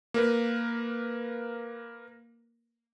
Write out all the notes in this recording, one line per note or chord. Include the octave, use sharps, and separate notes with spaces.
A#3 A#4 B4